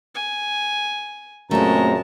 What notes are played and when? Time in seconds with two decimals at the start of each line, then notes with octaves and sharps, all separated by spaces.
0.15 G#5
1.51 F#2 A#2 C#3 G#3 A3 C4 A5 A#5